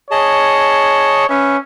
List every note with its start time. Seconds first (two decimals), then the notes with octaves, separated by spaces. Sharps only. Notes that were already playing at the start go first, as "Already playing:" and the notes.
0.11 G#4 C#5 D#5 A5
1.30 C#4 B4 E5